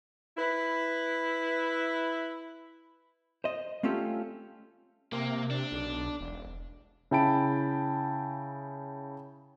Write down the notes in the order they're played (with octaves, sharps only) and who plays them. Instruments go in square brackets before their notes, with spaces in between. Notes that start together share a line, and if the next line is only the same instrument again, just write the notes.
[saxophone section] E4 B4
[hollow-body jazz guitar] C5 D#5
A3 C4 C#4 F4 G4 A4
[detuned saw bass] C3 [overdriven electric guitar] A#3
[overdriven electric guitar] D4
[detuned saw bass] B1
E1
[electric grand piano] C#3 E4 G5 A5 B5 D7